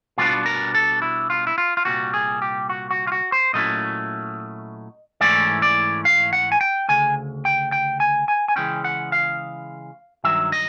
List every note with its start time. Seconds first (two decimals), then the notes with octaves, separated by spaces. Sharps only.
0.18 B2 G3 B3 D4 F4
0.46 A#4
0.74 A4
1.02 E4
1.30 F4
1.47 E4
1.58 F4
1.77 F4
1.85 C2 A#2 G3 F#4
2.14 G#4
2.42 G4
2.69 F#4
2.91 F#4
3.07 F4
3.12 F#4
3.32 C5
3.53 A#2 F#3 A3 C#4 E4 D#5
5.21 G#2 E3 A3 C#4 E4 D5
5.62 D5
6.05 F5
6.33 F#5
6.52 G#5
6.61 G5
6.88 D2 C#3 G#5
7.45 G5
7.72 G5
8.00 G#5
8.28 G#5
8.48 G#5
8.56 C#3 E3 G#3 C#4 G5
8.84 F#5
9.12 F5
10.24 G2 D#3 F#3 E5
10.52 D#5